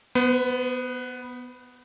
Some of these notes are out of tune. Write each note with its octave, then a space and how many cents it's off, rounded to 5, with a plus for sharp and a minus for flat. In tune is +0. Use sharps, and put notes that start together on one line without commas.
B3 +0 C5 -45